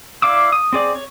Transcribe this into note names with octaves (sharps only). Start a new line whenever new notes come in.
E4 D5 F5 D6 E6
D#6
C4 G#4 D5
C#5